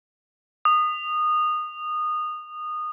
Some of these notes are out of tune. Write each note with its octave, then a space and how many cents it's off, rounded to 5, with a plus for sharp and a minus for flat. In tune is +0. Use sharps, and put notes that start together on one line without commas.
D#6 -20